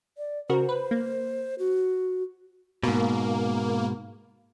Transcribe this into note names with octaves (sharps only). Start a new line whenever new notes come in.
D5
C#3 F#4 A#4 C5
B4
A#3
F#4
G#2 B2 A#3